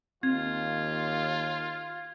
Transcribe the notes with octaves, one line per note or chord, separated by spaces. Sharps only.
D#2 C4 F4 G#6